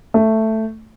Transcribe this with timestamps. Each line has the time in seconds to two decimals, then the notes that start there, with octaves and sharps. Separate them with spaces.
0.14 A3